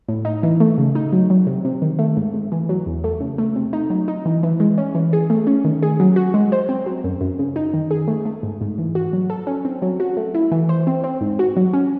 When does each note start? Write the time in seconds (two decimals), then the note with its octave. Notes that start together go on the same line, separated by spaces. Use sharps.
0.08 A2
0.25 D#4
0.43 E3
0.60 A3
0.78 C#3
0.95 D#4
1.12 F#3
1.30 F#3
1.47 C3
1.65 C3
1.82 D#3
1.99 A3
2.17 G#2
2.34 G#2
2.52 E3
2.69 F#3
2.86 E2
3.04 A3
3.20 C#3
3.38 A3
3.56 C3
3.73 D#4
3.90 F#3
4.08 D#4
4.26 E3
4.43 E3
4.60 G#3
4.78 C#4
4.95 E3
5.13 G#4
5.30 A3
5.47 C#4
5.65 D#3
5.83 G#4
6.00 F#3
6.16 F#4
6.34 G#3
6.52 C5
6.69 C4
6.86 F#3
7.04 F#2
7.21 F#2
7.39 C#3
7.56 D#4
7.74 D#3
7.91 G#4
8.08 A3
8.25 A3
8.43 G#2
8.61 G#2
8.78 E3
8.95 F#4
9.13 F#3
9.30 A4
9.47 C#4
9.65 C4
9.82 F#3
10.00 F#4
10.17 A3
10.35 E4
10.51 E3
10.69 C5
10.87 C4
11.04 C4
11.21 G#2
11.39 F#4
11.57 F#3
11.73 C#4